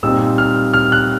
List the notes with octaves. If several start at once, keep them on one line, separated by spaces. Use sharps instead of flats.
A#2 G3 C4 D#4 E6
F6
F6
F#6